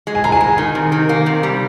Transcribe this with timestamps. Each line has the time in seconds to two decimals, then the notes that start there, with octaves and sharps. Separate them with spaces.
0.07 G#3
0.15 G#5
0.24 G#3 A#5
0.32 G#5
0.41 G#3
0.58 D#3
0.75 C3
0.92 D#3
1.09 A#3
1.26 C3
1.43 G3